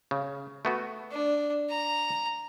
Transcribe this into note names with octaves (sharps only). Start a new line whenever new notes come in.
C#3
A3 B3 F#4
D4
A#5